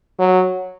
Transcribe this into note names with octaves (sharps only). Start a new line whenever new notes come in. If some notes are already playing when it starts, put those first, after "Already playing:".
F#3